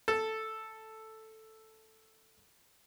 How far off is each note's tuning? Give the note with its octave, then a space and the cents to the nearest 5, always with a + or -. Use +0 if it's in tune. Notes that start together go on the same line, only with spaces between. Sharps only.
A4 +0 A5 +0